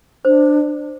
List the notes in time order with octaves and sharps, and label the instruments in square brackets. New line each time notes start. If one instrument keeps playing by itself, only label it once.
[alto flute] D4 [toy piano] C5